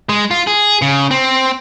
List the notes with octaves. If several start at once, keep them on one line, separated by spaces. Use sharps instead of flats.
G#3
F4
G#4
C#3
C4